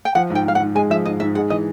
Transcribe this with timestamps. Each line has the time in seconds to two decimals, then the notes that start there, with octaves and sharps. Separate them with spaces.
0.05 G5
0.15 F3 F#5
0.30 G#2
0.35 G5
0.45 G#2 F5
0.55 F#5
0.60 G#2
0.75 G#3 G#5
0.90 F3 E5
1.05 G#2 D#5
1.20 G#2 E5
1.35 G#3 F#5
1.50 E3 D#5